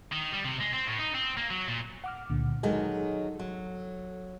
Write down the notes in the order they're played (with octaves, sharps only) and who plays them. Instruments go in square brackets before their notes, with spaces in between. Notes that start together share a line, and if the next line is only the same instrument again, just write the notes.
[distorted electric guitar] D#3
G3
C3
G#3
C4
A2
D#4
C4
A#3
F#3
A#2
[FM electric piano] F#5 D6 F6
C#2 A#2 D3
[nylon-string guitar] D#3 F#3 G#3 [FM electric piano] A4
[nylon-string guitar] F#3